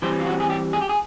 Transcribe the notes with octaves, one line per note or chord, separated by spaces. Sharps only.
E3 G3 C4 C5
F4
F#4
G#4
G4
G#4
G4
G#4